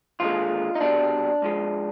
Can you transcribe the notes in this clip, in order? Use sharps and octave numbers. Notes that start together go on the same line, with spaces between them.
D#2 D3 G#3 F4
D#4
C2 B2 G3 D4
G#2 F3 G#3